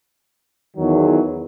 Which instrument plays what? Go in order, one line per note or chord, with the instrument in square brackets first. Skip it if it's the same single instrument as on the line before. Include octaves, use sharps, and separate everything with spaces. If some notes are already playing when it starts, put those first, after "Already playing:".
[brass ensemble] E2 D#3 F#3